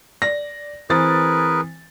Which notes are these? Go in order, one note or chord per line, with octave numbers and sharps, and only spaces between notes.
D5 A#6
E3 C4 G#4 A#4 B4 A6